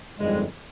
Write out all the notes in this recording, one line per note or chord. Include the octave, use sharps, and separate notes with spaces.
G1 F2 D#3 G3 G#3